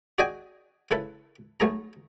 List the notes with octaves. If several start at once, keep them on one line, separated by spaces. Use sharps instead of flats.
F#4 G#4 D5 D#5 G5 G#5
C#3 E4 A4 B4
B1 A3 G#4 A#5